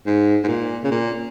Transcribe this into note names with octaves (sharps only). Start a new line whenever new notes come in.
G#2
G#2
A#2
C#3
A#2